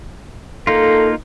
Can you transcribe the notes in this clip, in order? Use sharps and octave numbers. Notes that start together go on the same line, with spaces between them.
A#3 D#4 F4 A4